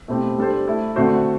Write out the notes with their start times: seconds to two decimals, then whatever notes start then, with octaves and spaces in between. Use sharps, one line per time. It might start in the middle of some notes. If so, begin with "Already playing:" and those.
0.08 B2 A3 C4 E4 G4
0.38 G3 D4 A4 C5
0.67 A3 E4 A4
0.96 D3 A3 C4 F#4 C5